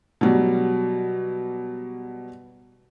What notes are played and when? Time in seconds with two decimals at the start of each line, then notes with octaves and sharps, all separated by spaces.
0.21 B2 F#3 G3